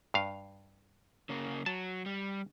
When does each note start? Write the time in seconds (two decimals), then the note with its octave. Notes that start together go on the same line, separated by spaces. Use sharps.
0.14 G2 F5
1.29 C#3 A#3
1.66 F#3 A5
2.06 G3